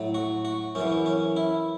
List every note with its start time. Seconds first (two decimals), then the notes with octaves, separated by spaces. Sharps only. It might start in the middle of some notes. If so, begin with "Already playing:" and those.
Already playing: A2 F#3
0.14 F#4
0.45 F#4
0.75 F#2 C#3 E3 C#4
1.06 C#4
1.36 E4